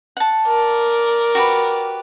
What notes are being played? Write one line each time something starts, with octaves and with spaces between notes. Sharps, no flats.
F#5 A5
A#4 D5
F#4 G4 B4